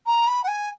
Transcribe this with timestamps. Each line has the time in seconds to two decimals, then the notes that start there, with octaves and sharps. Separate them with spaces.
0.06 A#5
0.27 B5
0.44 F#5
0.48 G#5